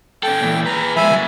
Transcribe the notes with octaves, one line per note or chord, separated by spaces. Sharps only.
C#4 A4 G5
A#2 E3
G#4 B4 A#5
F3 G#3 E5 G#5 B5
C#3 F#3